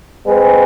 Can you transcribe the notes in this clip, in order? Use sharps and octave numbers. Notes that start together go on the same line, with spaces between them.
G#3 C4 G#4 B4